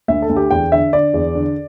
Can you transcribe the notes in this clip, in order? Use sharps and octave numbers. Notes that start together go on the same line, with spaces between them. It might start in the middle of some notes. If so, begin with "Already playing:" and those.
D2 E5
A4
D2
G4
E2 G5
D3 E5
D3 D5
E2
D3